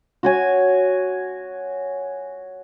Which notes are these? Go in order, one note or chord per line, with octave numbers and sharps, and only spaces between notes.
F#4 C#5 G#5